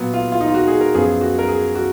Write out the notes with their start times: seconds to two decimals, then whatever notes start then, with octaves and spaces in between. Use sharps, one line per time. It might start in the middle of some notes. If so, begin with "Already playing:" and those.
Already playing: A#2 F#3 B3
0.14 F4
0.32 F4
0.40 D#4
0.48 F4
0.54 F#4
0.67 G#4
0.81 A#4
0.94 F#2 F3 B3 G#4
1.21 F#4
1.39 A#4
1.48 G#4
1.75 F#4